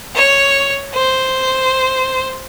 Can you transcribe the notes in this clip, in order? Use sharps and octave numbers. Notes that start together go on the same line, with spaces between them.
C#5
C5